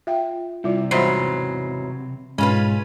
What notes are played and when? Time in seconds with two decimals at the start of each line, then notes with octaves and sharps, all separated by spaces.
0.07 F4 E5 F5 G5
0.64 C3 G3 E4 F4 D5
0.91 E2 G#2 F#3 G3 C5 B5 B6 C7
2.38 G#2 B2 G#3 C#4 F4 B4 B5